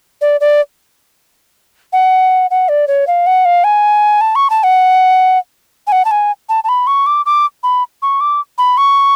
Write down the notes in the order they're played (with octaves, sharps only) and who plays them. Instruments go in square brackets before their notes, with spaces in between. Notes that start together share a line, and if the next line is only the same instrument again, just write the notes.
[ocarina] D5
D5
F#5
F#5
D5
C#5
F5
F#5
F5
G#5
A5
C#6
A5
F#5
G#5
F#5
A5
G#5
A5
A5
B5
C#6
D6
D6
B5
C#6
D6
B5
C#6